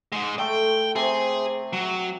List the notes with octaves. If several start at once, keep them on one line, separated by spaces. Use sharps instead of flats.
G#2 G#3
A3 G5
C3 G#4
F#3